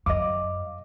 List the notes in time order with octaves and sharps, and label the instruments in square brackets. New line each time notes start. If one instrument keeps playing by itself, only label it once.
[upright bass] F#2 [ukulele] D#5 F5 [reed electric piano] D6